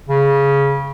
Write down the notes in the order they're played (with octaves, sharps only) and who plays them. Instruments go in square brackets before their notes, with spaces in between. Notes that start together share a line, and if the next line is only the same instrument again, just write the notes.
[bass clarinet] C#3